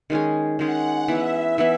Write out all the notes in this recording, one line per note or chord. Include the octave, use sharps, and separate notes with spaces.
D#3 G#3 C#4 G#4
D#3 G#3 C#4 G#4 F#5
E3 B3 E4 E5
E3 B3 E4